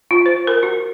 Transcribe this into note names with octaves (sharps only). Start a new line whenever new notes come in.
F4
C5
A#4
F#4